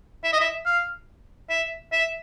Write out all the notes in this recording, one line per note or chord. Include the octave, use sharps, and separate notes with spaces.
E5
D#5
E5
F5
E5
E5